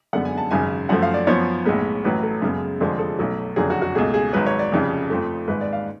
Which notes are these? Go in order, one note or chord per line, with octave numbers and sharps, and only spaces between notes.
F#2 D3 G#3 B3 F#5
G#5
A5
G#1 F#2 C#3 G#5
F#2 F3 A3 F#5
F5
D5
F#2 F3 B3 C#5
B1 A2 G#3 B3
A1 A2 F#3 B4
A4
F#2 C#3 G#3 B3
F1 F2 D3 F3 G#3 G#4
A4
B1 B2 F#3 A3
F#1 F2 D3 F#3 G#4
F#4
F#4
C#2 B2 A3 G#4
G#4
G#1 G#2 F#3 B4
C#5
D5
F1 F2 C#3
F2 F3 A3
G#1 G#2 G#3 B4
D5
F5